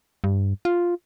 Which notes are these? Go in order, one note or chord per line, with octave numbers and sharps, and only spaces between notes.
G2
F4